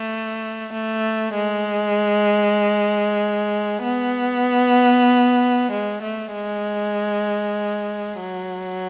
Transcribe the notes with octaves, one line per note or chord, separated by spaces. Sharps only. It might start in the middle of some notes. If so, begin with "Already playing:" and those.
Already playing: A3
A3
G#3
B3
G#3
A3
G#3
F#3